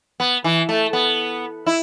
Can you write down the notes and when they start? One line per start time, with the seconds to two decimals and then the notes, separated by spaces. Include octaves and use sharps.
0.20 B3
0.44 E3
0.69 A3
0.93 B3
1.66 E4